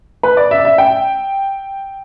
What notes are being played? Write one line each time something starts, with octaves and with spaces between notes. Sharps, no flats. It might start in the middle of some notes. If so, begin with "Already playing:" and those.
B4
D5
E5
D5
E5
G5